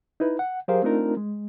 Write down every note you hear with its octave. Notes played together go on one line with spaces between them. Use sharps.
D#4 E4 B4
F#5
F#3 G4 G#4 A#4 C5 F5
A3 C4 D4 D#4 F4 A#4
G#3